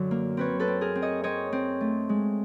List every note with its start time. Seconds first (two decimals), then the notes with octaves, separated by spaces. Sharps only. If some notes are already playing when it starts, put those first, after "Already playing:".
Already playing: F#2 D3 F#3
0.11 A#3
0.37 C4 B4 C#5
0.60 A4 B4
0.68 C4
0.81 G#4 A#4
0.95 C4
1.02 C#5 D#5
1.24 C4 C#5 D#5
1.52 C4
1.81 A3
2.09 G#3